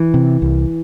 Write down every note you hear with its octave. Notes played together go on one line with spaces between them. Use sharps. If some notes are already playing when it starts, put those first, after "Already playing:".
Already playing: E3
C3
C2